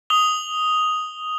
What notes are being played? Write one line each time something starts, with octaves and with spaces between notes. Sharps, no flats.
D#6 F7 G7